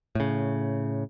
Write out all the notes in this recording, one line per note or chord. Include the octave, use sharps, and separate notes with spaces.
A2 C#3